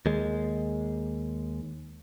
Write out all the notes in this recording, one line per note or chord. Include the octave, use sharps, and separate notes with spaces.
D#2 G#3